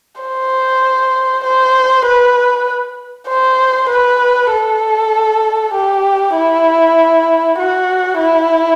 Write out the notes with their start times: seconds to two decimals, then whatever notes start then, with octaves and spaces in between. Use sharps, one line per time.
0.22 C5
1.45 C5
2.06 B4
3.29 C5
3.90 B4
4.52 A4
5.74 G4
6.36 E4
7.59 F#4
8.20 E4